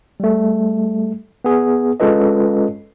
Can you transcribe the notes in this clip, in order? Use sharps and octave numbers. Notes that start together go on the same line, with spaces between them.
G3 A3
B3 G#4
G#3 C#4 F4 A4 B4 D#5